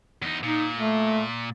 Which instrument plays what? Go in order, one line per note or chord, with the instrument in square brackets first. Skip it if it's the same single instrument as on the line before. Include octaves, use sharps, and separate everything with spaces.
[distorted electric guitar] E2 D#4
[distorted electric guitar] A#2 [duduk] D#4
[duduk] A3